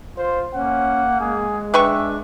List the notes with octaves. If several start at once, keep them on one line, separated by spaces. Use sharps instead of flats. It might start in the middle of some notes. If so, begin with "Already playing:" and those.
F4 C5
A#3 C#4 F#5
G#3 G#4
D4 B4 E5 G5 C#6